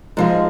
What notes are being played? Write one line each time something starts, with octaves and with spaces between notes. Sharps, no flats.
G#2 F3 G#3